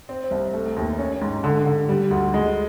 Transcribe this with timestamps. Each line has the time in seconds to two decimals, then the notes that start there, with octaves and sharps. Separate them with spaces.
0.09 C4
0.31 C2
0.53 A3
0.76 D#2
0.99 C#4
1.22 G#2
1.44 D3
1.66 D3
1.89 G3
2.11 D2
2.34 G#3